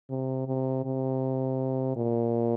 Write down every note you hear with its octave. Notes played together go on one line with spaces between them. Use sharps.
C3
C3
C3
A#2